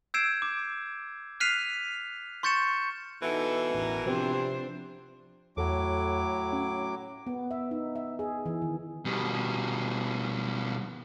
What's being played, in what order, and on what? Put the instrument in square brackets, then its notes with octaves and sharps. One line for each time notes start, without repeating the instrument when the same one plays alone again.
[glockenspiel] E6 G6 G#6 C7 D7 E7
D6
F6 F#6 B6 C7 D#7 F7
C6 C#6 G6 A6 C#7 E7
[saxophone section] B2 E3 [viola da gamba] D#4 A4 [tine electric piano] B4
[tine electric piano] A1 [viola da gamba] E2 A#4
[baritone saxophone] C3 [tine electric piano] F3 C4 [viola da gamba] D4 C5
[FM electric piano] E2 A4 [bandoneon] A2 F#3 D6
[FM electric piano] C#4
[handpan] B3
E5
D#4
E5
G#4
E3
D#3
[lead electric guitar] B2 G3